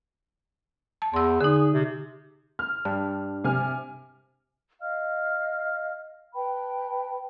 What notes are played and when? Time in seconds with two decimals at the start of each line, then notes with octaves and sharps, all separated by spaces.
1.02 A5
1.14 E2 C6 E6
1.41 D3 D#4 G#4
1.73 C3
2.59 F6
2.85 G2 D4
3.44 C3 G#5 F6
4.80 D#5 F5 F6
6.35 B4 G5 A5 B5